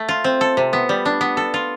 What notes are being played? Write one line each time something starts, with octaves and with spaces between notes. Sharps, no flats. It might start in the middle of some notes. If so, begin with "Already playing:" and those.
Already playing: A3
F4
C4
A4
C3
B3
G3
D4
B3
A4
F4